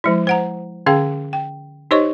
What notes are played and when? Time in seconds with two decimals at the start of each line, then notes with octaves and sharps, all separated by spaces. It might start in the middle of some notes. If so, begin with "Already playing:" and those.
0.04 F3 G#3 E4
0.27 C5 F#5 A#5
0.86 D3 C#4 G#4 F5 G5
1.33 G5
1.91 D#4 G4 C5 C#5 D#5 C#6